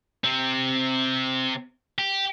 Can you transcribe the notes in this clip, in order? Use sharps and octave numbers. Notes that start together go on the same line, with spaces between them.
C3 C4
G4